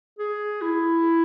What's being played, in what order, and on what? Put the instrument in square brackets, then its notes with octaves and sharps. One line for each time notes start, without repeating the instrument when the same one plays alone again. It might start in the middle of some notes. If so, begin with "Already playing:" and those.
[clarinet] G#4
E4